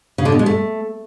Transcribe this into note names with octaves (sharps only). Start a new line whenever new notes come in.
C#3
D3
B2
G#3
A3